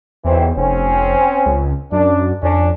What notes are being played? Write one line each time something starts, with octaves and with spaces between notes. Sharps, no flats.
B1 E2 E3 C4
F1 C4 C#4
C#2
F#2 D4
F2 C#4 D4